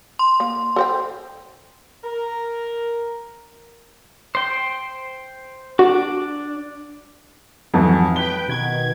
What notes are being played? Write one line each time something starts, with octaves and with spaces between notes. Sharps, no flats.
C6
A#3
A4 C5 G5
A#4
C5 G5
D4 F#4
F2 G#2 E3 F#3
B4 G5 G7
B2 D#3 G#6